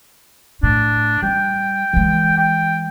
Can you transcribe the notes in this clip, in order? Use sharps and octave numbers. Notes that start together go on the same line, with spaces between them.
A2 D4
G3 G5
E3 G#3
G5